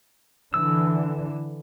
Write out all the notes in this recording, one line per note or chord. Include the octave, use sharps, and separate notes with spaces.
D3 E3 E6